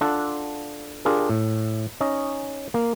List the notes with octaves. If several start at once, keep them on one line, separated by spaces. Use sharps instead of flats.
D4 F4 A4 F#5
D4 F4 G4 G#4 A#4
A2
C#4 D#4 D#5
A#3